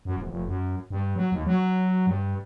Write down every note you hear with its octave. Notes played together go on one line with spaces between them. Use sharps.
F#2
E1
F1
F#2
G2
F#3
D#2
F#3
G2